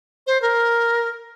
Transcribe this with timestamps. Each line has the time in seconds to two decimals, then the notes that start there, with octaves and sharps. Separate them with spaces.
0.27 C5
0.42 A#4